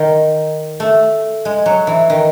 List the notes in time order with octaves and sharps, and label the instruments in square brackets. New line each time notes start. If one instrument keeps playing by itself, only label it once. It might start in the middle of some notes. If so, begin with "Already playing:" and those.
Already playing: [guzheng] D#3
A3
G#3
F#3
E3
D#3